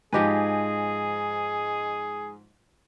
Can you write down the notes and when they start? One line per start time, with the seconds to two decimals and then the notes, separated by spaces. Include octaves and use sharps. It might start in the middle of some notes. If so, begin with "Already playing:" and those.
0.13 G#2 F3 G4 G#4 B4 D#5 G#5